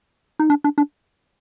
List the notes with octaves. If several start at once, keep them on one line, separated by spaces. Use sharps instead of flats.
D#4
D4
D4
D4